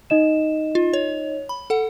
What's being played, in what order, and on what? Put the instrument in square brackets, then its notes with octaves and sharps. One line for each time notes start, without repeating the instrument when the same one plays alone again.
[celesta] D#4 D#5 E7
[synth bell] F4
C#5
B5
A4 F#5